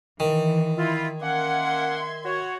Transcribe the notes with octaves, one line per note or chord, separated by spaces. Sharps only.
D#3 E3
E4 F4
A#3 C#4 E5 F#5 C6 G#6
F#4 C#5